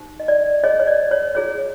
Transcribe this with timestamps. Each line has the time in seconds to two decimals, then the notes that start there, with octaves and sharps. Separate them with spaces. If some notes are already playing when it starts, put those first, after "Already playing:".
Already playing: D#4 G4 C5
0.20 D#5
0.28 D5
0.64 E4 G#4 C#5 D#5
0.80 C#5
0.87 D5
1.11 C#5
1.35 E4 G#4 C#5